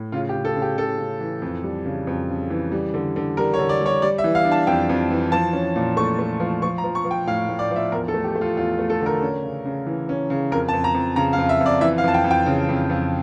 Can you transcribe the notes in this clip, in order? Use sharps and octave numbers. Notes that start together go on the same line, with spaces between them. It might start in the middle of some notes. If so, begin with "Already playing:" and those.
Already playing: A2
C#3 F4
G4
C#3
A4
C#3
G4
C#3 A4
C#3
E3
F2
G3
C#3
F2
C#3
E3
G3
D3
D3
G3 A#4
C#5
D3
D5
G3 C#5
G3 D5
E5
E3
F5
D4
A5
F2 G5
F2
E3
F3 A5
C#4
A#2
A3 C#6
A3
F3
F3 C#6
A#5
F3
C#6
F3
G5
A2 F5
A2
D5
F3 E5
E2 A#4
A4
A3
G4
A3
F4
E2 F4
A3
A4
D3
A#4
C#4
C#3
C#3
E3
C#4
C#3
F2 A#4
A5
F2
A#5
F2
C#3 A#5
F5
F2
E5
F2
D5
E3 E5
F5
F2 A5
G5
F2
G5
C#3
F2
F2